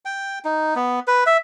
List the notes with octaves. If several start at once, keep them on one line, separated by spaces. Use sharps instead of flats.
G5
D#4
B3
B4
E5